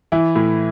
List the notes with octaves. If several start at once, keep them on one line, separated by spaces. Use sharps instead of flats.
E3 E4
A2